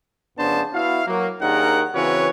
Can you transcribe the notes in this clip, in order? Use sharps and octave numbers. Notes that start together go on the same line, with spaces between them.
F2 C#3 B3 D4 C5 A5
B3 E4 F#4 E5 F5
F#3 A#3
D#2 D#3 D4 G#4 A#4 F#5
C#3 E3 C4 F#4 B4 C#5